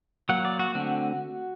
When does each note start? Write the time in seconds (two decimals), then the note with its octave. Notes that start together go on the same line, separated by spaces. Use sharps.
0.29 F#3 A#3 F#5
0.45 D5
0.59 F#4
0.75 D3 A3 C4 F#4